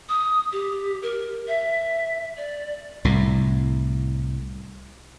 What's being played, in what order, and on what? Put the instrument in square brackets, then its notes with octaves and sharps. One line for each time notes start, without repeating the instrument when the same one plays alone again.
[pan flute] D#6
G4
A#4
E5
D5
[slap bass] C2 A2